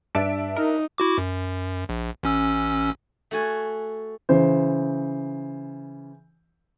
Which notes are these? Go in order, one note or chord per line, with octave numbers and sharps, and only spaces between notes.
G2 D4 E5 A5 D7
D#4 A#4
E4 F#4 D6
F#2
A#1
A1 C#4 E6
A3 F#4 G#5
C#3 E3 C5